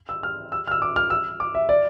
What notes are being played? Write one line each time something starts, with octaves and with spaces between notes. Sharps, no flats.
E6
F6
E6
F6
E6
D6
F6
E6
D6
E5
D5